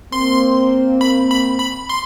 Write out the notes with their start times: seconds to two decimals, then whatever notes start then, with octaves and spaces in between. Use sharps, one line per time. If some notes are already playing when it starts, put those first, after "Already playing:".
0.12 A#3 C4 C6
1.01 B5
1.31 B5
1.60 B5
1.89 C6